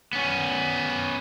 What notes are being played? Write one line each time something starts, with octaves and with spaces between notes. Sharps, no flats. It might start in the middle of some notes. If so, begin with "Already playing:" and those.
B3 C#4